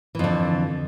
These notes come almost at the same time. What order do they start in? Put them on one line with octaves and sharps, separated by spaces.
E3 F2 D3